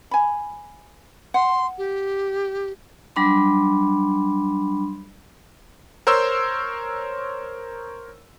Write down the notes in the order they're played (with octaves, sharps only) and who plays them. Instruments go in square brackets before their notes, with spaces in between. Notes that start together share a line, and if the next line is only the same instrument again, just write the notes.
[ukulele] G#5 B5
[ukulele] F#5 [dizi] C6
[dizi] G4
[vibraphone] F#3 G3 D4 B5 C6
[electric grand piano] A#4 C5 C#5 C6 E6